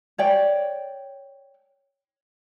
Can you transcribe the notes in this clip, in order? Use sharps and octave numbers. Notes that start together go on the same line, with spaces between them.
C#5 D5 G5